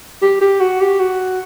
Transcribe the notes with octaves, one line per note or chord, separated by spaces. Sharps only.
G4
G4
F#4
G4
F#4